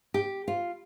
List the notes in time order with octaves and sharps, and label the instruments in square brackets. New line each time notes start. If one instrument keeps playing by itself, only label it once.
[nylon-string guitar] G4
F4